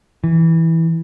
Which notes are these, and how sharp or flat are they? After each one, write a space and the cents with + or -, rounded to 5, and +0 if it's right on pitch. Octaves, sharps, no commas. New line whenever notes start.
E3 -10